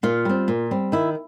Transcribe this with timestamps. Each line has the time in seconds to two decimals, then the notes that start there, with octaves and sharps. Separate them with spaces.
0.03 A#2 F4
0.25 G3 C4
0.48 A#2
0.71 G3 C4
0.92 D#3 E4